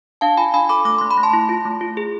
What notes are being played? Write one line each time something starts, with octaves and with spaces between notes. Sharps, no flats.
D4 F5 A5
F4 G#5 B5
D4 G#5 B5
A4 B5 D6
A3 D6
A3 C6
B5
A3
A5 C6
E4
F4
A3
F4
G#4